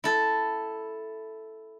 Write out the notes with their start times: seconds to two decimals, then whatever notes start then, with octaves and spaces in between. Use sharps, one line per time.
0.04 E4 A4